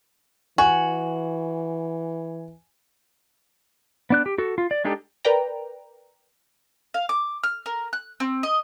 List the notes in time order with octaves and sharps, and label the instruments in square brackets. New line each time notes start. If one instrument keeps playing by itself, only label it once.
[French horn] E3 [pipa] F#4 [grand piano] G#5
[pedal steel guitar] B3 D4 F#6
G4
F#4 A4
F4
D5
G#3 D4 D#4 G4 A4
[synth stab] A#4 B4 D5 G5 A#5
[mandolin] F5
D6
F6
A#4
F#6
C4
D#5